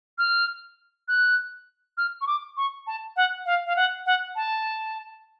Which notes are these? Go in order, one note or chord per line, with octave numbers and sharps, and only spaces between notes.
F6
F#6
F6
C#6
D6
C#6
A5
F#5
F5
F5
F#5
F#5
A5